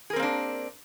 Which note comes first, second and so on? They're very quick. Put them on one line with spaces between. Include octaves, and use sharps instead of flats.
G#4 A#4 C4 A#3 D4